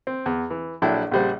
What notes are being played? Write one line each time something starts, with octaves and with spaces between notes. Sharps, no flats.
C4
E2
E3
A#1 F#3 D4 E4 A4 G5
A#1 C#3 G3 C5 F#5